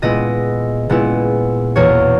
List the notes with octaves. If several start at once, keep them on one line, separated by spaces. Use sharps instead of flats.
A#2 G#3 B3 E4 D#5
A#2 G#3 B3 E4
E2 B2 A#3 C#5